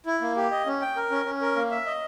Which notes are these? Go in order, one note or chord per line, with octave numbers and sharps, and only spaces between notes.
E4
A#3
G4
D#5
C#4
G5
A#4
C#4
C#4
A#4
A#3
E5
D#5